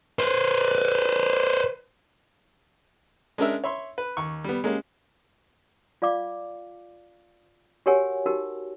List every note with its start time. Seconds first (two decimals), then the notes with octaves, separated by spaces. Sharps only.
0.19 B4 C5
3.38 G#3 C#4 D4 A#4 E5
3.64 C#5 E5 B5 C6
3.98 B4
4.17 D#2 C#6
4.44 G3 B3
4.64 G#3 A#3 C#4 G4
6.02 F4 D5 F5 D6
7.86 F#4 G4 A#4 C#5 F#5 G#5
8.26 D#4 F#4 G4 A#4